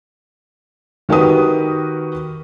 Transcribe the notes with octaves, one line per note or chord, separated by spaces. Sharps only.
D#3 F#4 G4 A#4 B4 D#6